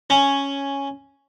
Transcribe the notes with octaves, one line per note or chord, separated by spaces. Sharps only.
C#4